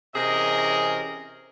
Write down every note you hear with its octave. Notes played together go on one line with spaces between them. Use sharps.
C3 E3 C#4 G#4 A#4 D#5